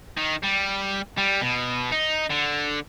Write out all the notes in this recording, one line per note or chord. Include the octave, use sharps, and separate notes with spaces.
D#3
G3
G3
B2
D#4
D3